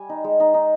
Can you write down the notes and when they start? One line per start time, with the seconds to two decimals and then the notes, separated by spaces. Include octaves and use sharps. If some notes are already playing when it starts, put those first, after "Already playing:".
Already playing: G3 G#5
0.09 D#4
0.24 G#3
0.40 D#4
0.54 D#4